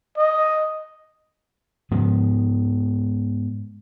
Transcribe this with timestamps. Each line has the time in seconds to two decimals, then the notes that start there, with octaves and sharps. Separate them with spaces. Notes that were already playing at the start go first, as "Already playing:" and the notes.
0.17 D#5
1.91 G#2 F3 G#3 B3